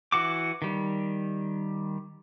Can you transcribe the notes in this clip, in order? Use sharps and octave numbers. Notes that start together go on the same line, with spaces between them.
E3 F#4 D6
D#3 G3